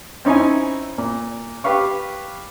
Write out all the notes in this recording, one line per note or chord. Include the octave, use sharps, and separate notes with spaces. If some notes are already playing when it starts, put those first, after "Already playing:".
C4 C#4 D#4 E4 G#5
A#2
G4 B4 F5 C#6